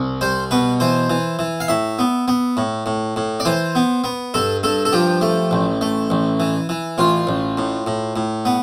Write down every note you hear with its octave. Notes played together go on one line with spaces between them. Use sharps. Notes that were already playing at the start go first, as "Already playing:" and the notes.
Already playing: C2
G3 C5
B2 B4
E3 C5
E3
E3
F5
A2 E5
B3
B3
A2
A2
A2
D5
E3 C5
B3
B3
G2 A4
G2 A4
A4
F3 G4
A3
A1
A3
A1
E3
E3
A1 F4
A1
A2
A2
A2
B3